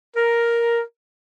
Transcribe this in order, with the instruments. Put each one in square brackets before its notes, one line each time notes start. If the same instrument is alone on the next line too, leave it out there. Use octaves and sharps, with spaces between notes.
[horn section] A#4